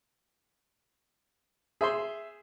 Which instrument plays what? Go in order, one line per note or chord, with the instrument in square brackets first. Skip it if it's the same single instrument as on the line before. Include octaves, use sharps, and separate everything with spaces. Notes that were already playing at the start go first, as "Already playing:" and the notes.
[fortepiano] G#4 C5 C6 [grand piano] E5